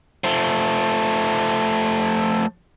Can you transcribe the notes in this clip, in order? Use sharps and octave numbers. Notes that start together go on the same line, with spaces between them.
F3 A3